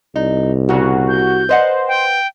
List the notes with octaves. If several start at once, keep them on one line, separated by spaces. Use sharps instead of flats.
C2 D#4
A#2 C#3 F#4
G6
B4 C5 D#5 F#5
G5